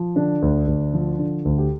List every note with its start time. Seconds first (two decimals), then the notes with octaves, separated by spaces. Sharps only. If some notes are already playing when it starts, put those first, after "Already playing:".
Already playing: F3
0.15 D3 D4
0.42 D2
0.67 D2
0.94 F3
1.19 D3
1.45 D2
1.58 G4